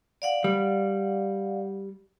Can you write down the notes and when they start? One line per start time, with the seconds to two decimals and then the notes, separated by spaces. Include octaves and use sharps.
0.22 D5 F5 F#5
0.44 G3